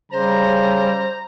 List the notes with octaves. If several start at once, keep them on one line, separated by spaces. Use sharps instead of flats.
C#3 G3 C5 A#5